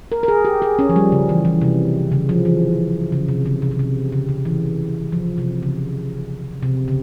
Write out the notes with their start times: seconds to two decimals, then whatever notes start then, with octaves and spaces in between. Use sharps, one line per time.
0.12 A#4
0.23 A#4
0.28 G#4
0.45 G4
0.62 G#4
0.79 C#4
0.89 F3
0.96 G3
1.12 C#3
1.29 E3
1.45 E3
1.62 C3
2.12 C#3
2.29 F3
2.45 E3
3.12 C#3
3.28 C3
3.46 C#3
3.62 C3
3.71 C#3
3.79 C3
4.12 C#3
4.29 C#3
4.45 E3
5.12 F3
5.38 C3
5.63 C#3
6.63 C3
6.88 C#3